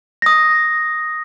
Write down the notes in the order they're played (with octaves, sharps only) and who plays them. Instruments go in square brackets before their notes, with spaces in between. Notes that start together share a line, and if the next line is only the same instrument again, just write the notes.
[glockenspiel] D#6 A#6